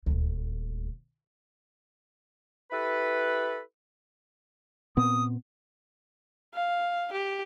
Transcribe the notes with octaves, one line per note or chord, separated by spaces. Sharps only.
D#1 D2
E4 G4 A4 B4
A#2 B3 C4 D#6
F5
G4